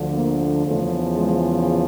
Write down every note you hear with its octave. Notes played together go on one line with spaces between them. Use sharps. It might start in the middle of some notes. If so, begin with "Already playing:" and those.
Already playing: D2 D3 F3
A#3
E2 C#3 F3 A3
G#3